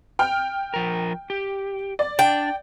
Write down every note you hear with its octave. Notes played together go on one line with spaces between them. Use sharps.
G5 F6
F3 A#4
G4
D5
D4 G5